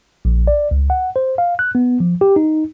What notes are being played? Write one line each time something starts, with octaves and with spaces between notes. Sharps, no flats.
A#1
D5
C#2
F#5
C5
F5
F#6
B3
F3
G4
D#4